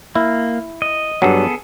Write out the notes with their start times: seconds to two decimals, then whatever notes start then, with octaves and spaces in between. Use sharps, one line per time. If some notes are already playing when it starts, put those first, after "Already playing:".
0.15 A#3 E4
0.82 D#5
1.22 G2 F#3 B3 G#4 A4